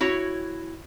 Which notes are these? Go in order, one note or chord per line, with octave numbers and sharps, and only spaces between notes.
E4 F#4 C#5